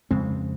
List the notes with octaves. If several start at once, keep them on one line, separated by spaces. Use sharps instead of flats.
F2 C#3 G#3 C4